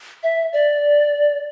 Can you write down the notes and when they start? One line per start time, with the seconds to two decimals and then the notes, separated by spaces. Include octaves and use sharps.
0.23 E5
0.53 D5